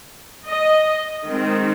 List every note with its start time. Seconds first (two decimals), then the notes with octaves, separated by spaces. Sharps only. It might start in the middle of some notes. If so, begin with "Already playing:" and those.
0.46 D#5
1.24 D#3 G#3 C4